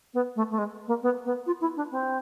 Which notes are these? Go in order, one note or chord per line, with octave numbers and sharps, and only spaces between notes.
B3
A3
A3
G#3
A#3
B3
B3
F4
E4
D4
C4